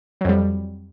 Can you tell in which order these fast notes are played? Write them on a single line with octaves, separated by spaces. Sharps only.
F#3 F2 G3